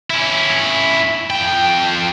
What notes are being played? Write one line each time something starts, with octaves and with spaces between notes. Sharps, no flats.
C#4 E4
F2 G5